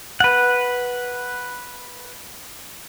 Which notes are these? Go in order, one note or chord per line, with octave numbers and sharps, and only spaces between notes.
B4 F#5